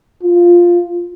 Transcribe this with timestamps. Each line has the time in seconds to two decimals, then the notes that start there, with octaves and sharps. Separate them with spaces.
0.23 F4